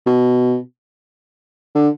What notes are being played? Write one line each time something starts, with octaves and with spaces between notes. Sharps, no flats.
B2
D3